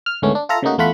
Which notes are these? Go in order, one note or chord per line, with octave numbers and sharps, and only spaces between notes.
F6
D2 G#2 D#3 A3 B3 C#4
D4
F4 A4 E5 A#5
C#3 A3 A#3 D#4 F#4
E2 A3 F4 F#5 B5